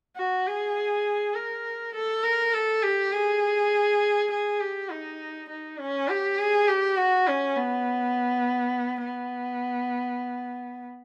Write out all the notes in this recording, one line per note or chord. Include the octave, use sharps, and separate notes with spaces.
F#4
G#4
A#4
A4
A#4
A4
G4
G#4
G#4
G4
D#4
D#4
C#4
G4
G#4
G4
F#4
C#4
B3
B3